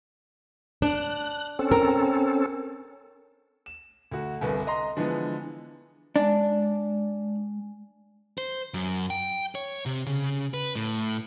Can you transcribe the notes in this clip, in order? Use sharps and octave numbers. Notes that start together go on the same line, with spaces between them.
D4 F#6
C4 C#4 A4
A#4
E7
D2 F#4
G1 C2 B4
D#5 A#5 C6
D3 E3 F3 G#3 B3
G#3 D4
C5
F#2
G5
C#5
C3
C#3
B4
A2